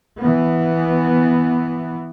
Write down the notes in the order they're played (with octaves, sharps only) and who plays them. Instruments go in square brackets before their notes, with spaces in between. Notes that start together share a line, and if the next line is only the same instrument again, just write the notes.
[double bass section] E3 B3